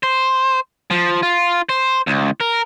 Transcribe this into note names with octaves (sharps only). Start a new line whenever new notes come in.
C5
F3
F4
C5
C#2
A#4